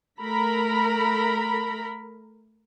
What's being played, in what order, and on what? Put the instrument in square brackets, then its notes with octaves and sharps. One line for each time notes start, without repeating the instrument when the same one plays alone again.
[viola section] A3 A#4 A#5 B5